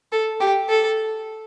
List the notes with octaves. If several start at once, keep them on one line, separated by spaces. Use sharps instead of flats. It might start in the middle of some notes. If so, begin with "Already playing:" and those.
A4
G4
A4